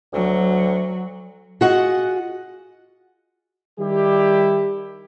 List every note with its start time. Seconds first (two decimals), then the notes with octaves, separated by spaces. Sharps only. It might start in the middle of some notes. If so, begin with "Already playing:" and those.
0.13 D2 F#3
1.61 F4 F#4 G#4 D#5 F#5
3.78 D#3 G3 E4 G4